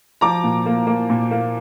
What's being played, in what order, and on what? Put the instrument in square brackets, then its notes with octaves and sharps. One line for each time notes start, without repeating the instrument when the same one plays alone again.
[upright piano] F3 A#5 D6
A#2
A#3
A#3
A#2
A#3